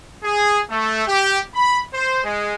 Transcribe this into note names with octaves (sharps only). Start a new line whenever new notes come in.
G#4
A3
G4
B5
C5
G#3